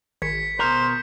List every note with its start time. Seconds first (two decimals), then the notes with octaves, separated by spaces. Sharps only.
0.22 G#1 G#6 B6 C#7
0.59 B2 A#4 C5